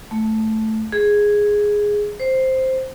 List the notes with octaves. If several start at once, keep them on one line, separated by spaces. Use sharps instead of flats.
A3
G#4
C5